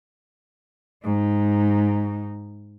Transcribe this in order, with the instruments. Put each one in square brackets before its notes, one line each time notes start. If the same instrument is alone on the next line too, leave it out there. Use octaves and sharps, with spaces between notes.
[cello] G#2 D#4